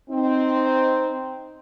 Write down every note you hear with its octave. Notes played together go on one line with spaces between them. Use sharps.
C4 D#4